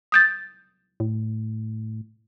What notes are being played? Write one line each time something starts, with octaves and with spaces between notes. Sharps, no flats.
D#6 G6 A6
A2